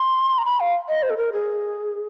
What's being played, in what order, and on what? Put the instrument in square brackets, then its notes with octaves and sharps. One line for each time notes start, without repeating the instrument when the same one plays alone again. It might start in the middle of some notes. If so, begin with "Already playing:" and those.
Already playing: [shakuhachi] C6
A#5
B5
F5
D#5
C5
A4
A#4
G#4